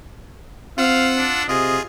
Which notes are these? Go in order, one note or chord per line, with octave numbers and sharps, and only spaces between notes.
C4 F4 F5 F#5 E6
D4
C3 F4 G#4 D#5